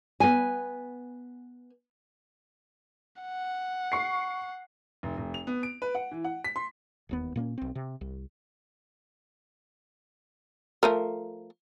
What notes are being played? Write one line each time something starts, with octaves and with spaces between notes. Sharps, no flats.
B3 G#5
F#5
C#6 C7
F1
F1
F7
B3
D7
B4
F#5
E3
F#5
B6
C6
E1 D#2 B3
A#2 A#3 C4 C#4
B1 C4
C3
C2
F3 A3 A#4